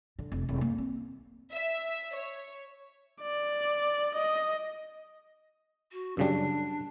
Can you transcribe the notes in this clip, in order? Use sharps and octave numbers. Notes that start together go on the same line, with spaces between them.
D3
F1
F1
A#3
C4
E5
C#5
D5
D#5
F#4
F#2 C#3 G3 D4